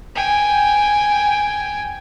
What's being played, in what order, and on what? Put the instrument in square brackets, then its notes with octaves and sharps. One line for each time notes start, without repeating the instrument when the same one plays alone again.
[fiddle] G5 G#5